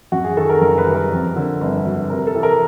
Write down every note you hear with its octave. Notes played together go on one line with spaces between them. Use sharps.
F#2 F#4
G#4
D#3 A4
A#4
F#1 A#4
B4
G3
A#4
F2
D3
G1
F#3
C3 A#4
A4
E3
A#4